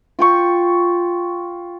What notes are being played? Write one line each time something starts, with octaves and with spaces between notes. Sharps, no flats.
F4 G5 C#6